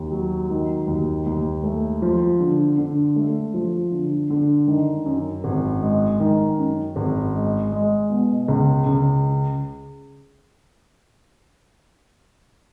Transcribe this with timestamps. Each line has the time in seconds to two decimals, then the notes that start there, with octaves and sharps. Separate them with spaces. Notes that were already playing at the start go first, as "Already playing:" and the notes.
Already playing: D#2
0.12 F#3
0.50 D#3
0.87 D#2
1.26 D#2
1.64 A3
2.02 F3
2.40 D3
2.78 D3
3.16 A3
3.54 F3
3.92 D3
4.30 D3
4.67 D#3
5.05 F#2
5.44 G#1
5.82 G#3
6.20 D#3
6.58 F#2
6.96 G#1
7.34 G#3
7.72 G#3
8.10 B2
8.48 C#2
8.86 C#2